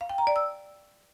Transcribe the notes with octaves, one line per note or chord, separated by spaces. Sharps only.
F5
G5
A#5
D5
E6